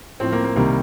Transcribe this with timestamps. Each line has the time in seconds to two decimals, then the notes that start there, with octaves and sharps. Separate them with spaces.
0.20 A2 F3 C4
0.32 A#3
0.44 A#3
0.56 C2 C3 D#3 G3 A#3